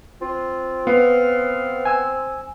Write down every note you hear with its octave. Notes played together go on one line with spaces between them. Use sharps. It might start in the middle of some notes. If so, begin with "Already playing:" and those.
C4 F4
B3 F5
G#5 E6